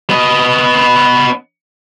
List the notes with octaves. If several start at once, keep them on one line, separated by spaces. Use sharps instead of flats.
B3 D#5